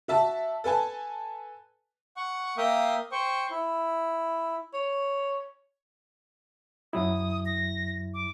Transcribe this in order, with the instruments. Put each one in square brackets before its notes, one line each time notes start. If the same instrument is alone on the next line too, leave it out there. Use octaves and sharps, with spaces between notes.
[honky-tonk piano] F#4 E5 A5
A4 B4 G#5 A5
[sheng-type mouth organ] F#5 C#6
A#3 E5 F5 G5 D#6
C5 G5 C#6
E4
[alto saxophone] C#5
[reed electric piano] F#2 F#3 E4 [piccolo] D#6
[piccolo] A#6
D6